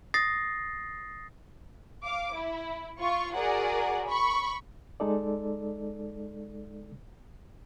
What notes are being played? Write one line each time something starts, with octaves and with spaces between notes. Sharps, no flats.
D#6 A6 A#6 C7
F5 D6
E4
F4 C#6
F#4 G#4 A#4 D5 F#5
B5 C#6
G#3 D#4 A4 D5